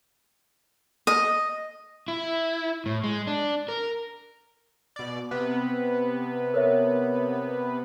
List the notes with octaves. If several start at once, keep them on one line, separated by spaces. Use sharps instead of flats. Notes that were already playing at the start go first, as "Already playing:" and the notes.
D#5
E4
A2
G#3
D4
A#4
B2 D5
C3 B3 B4
A#4 C#5 E5